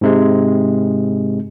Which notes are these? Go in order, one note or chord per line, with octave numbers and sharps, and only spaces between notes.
G#2 C3 G#3